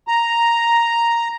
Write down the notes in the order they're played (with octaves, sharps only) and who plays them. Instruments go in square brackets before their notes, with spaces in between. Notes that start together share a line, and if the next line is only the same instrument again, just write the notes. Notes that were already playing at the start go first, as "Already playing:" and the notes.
[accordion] A#5